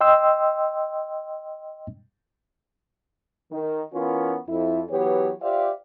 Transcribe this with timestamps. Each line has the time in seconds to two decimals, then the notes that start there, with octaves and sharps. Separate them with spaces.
0.01 D#5 G5 C6 E6
3.52 D#3
3.94 E3 B3 C#4 F4 A#4
4.49 F2 E4
4.91 E3 F#3 B3 G4 C#5
5.42 F4 G4 C5 D5 E5 F5